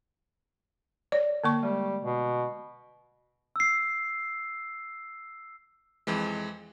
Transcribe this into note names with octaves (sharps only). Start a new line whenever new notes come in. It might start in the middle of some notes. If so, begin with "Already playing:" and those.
C#5 D5
D3 A#3 C#6
G3 G#3
B2
E6 C7
F2 E3 G#3